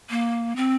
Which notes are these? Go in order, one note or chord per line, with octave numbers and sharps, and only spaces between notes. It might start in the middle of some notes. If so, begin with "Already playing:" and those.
A#3
C4